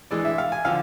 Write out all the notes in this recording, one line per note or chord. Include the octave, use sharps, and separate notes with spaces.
E3 G#3 D4 D5
E5
F5
G#5
D3 F3 F5